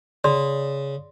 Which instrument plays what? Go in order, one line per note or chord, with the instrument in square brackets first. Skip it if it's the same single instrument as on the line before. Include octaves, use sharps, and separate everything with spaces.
[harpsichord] C#3 [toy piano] D5 C6